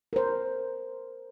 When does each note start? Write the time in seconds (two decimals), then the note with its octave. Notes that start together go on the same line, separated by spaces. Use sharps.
0.13 A#4 C5